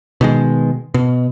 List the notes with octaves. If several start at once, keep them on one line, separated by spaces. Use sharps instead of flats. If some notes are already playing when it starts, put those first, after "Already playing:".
B2 D#3 G#3
B2